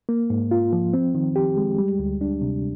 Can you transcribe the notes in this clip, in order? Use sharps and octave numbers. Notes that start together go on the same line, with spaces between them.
A#3
G#2
F4
F3
C4
D#3
G4
G#3
G3
D2
D4
C3